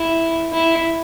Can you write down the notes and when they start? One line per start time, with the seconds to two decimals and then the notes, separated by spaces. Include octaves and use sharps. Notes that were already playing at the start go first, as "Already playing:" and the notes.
Already playing: E4
0.53 E4